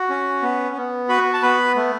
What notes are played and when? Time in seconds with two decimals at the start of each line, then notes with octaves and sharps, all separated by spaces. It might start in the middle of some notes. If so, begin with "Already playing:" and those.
Already playing: F#4
0.09 C#4
0.42 B3
0.76 B3
1.09 F#4 B4 B5
1.33 A5
1.42 B3 B4 B5
1.75 A3